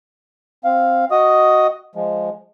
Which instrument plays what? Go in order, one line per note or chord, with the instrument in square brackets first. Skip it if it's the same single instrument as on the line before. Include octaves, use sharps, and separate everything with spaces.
[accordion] C4 F5
F#4 D#5 D#6
F3 G#3